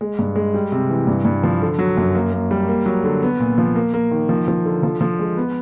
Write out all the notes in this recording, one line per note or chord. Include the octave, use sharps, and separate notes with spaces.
G#3
G2
G#3
G3
C3
E3
G2
G2
F3
D3
F#3
F#2
A#3
A#3
G3
A#3
F#3
D3
B3
A#2
F3
A#3
A#3
D#3
F3
F3
D3
F3
F3
G#3
B3